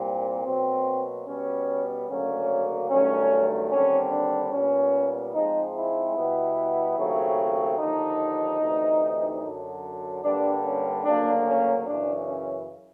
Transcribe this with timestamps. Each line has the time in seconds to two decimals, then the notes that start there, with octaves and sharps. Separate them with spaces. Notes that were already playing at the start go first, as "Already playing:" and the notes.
Already playing: C2 A#2 G3 C4
0.45 B2 F#3 A#3 C4
1.27 B2 G3 B3 C#4
2.08 D2 C#3 F#3 A#3 C#4
2.90 G2 D#3 F#3 A3 C#4
3.71 D#2 D3 G3 C4 C#4
4.12 D4
4.52 A#2 G3 B3 C#4
5.34 G#2 F3 G#3 C4 D#4
5.75 E4
6.16 B2 G3 B3
6.97 D#2 C#3 F#3 A3 C4
7.79 D#2 D3 F3 D#4
8.60 D2 C3 E3
9.42 F#2 D3 F#3
10.23 G2 D3 G3 A#3 D4
10.64 C#4
11.05 D2 C#3 F#3 A#3 D4
11.46 C#4
11.86 F#2 C#3 E3 D4
12.27 C#4